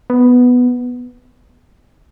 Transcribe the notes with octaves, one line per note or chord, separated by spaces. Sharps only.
B3